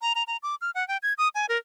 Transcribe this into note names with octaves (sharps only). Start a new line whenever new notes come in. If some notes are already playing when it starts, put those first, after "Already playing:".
A#5
A#5
A#5
D6
F6
F#5
G5
G#6
D#6
G#5
A#4